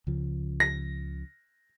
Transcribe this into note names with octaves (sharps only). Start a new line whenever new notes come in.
C#2 C#3 F3
A#6